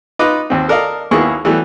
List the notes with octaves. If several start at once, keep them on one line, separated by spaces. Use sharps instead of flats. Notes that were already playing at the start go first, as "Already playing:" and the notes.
D#4 F4 B4 D#5 D6
D#2 C4
A4 A#4 D5 D#5 F5
D#2 A#3 B3 E4 G#4 C#6
E3 F#3 G3 A3 B3